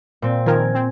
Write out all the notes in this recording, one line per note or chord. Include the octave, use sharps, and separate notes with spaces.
A#2 C4
D#3 F3 A#4 G#5
C4